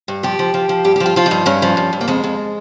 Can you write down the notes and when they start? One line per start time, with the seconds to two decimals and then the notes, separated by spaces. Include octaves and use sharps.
0.08 G2
0.23 F3 G4
0.39 F3
0.54 F3
0.69 F3
0.84 G2 G4
0.96 G4
1.00 F3
1.06 F4
1.16 F3 F4
1.26 D#4
1.31 G2
1.46 G2 C#4
1.62 F3
1.77 G2
1.93 G2
2.01 A#3
2.08 F2 G#3
2.24 F2